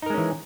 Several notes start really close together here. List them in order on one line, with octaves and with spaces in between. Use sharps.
D#4 A#4 G#3 C#4 E3